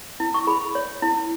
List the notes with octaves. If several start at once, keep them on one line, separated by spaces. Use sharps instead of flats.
E4
C#6
G#4 B5
C#5
E4